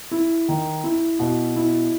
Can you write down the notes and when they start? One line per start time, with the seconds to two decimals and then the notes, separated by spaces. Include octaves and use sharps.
0.11 E4
0.48 D#3
0.84 E4
1.19 B2
1.56 E4